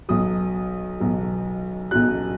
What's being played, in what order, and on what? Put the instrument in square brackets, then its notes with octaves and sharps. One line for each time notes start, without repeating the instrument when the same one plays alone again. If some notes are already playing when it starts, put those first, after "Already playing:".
[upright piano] B1 B2 F#3 D#6
B1 B2 F#3
B1 B2 F#3 F#6